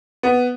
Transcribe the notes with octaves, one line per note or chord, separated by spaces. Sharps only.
B3